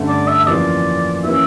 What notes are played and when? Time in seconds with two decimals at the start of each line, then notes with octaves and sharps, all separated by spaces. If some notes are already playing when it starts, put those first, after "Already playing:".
Already playing: G2 D3 A3 C#4
0.08 D5
0.27 E5
0.39 E5
0.47 F2 E3 A#3 C#4 F4 D5
1.24 E3 A#3 C#4 E5